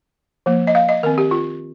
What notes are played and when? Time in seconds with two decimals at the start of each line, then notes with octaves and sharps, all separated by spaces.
0.46 F3 A#3
0.67 D#5
0.75 F5
0.89 D#5
1.03 D#3 C4 A#4
1.18 G4
1.31 F4